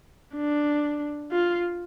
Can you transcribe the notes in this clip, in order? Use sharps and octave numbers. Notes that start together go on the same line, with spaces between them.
D4
F4